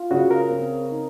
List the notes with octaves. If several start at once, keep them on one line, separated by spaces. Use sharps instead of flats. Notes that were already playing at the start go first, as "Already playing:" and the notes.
Already playing: F4
C#3 F#4
A#4
C4
D#4